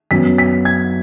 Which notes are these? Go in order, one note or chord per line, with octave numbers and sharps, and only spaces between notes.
F#2 F#3 B3 B6
B6
G#6